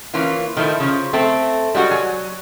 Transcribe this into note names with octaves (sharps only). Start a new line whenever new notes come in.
E3 A#3 C#4 F4
D#3 F3 A3 E4
C#3 F3
A3 C4
G3 G#3 F#4 G4
F#3 G#5